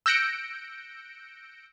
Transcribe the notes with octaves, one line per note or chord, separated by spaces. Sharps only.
E6 F#6 G6 A#6 C#7 D7